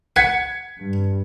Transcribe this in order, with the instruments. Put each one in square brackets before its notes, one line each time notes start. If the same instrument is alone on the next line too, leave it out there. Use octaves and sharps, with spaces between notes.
[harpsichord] F#5 [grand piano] G#6 B6 C#7
[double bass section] G2